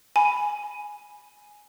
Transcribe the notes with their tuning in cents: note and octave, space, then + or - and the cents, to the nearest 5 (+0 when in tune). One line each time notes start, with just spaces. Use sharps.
G#5 +0 B5 +0